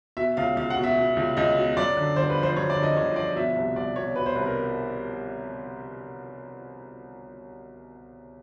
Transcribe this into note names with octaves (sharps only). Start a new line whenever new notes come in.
B2 E5
C#2 F5
C#2 F5
F#5
B2
E5
B2
C#2
C#2 D#5
B2
F#2 D5
D3
G1 C5
B4
F3
C5
F#2 C#5
D5
D3
D#5
G1 C#5
F3 D5
B2 E5
C2
C2 D5
B2 C#5
B2 B4
C5
C2 B4
A#4